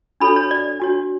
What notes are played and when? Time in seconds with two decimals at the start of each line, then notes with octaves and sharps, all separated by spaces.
0.20 D4 F#4 A4 C#5 B5
0.36 C#5
0.51 D5
0.80 D4 F#4 C#5